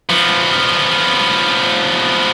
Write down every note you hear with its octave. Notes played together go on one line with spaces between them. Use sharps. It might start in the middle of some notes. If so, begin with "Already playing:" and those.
F3 B3